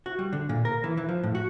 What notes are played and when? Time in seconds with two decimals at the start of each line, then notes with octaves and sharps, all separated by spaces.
0.06 F#4
0.19 G3
0.33 D3
0.49 A#2
0.65 A#4
0.84 E3
0.97 E3
1.09 F3
1.23 A2
1.35 F#4